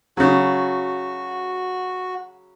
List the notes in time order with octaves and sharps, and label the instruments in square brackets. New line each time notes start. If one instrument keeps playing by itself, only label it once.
[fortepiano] C#3 F#3 [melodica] F#4